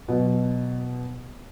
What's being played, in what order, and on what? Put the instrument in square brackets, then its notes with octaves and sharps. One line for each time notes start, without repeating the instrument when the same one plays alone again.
[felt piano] B2 F#3